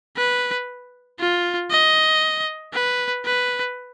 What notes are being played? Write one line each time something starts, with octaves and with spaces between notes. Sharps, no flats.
B4
F4
D#5
B4
B4